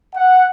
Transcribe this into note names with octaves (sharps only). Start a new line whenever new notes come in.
F#5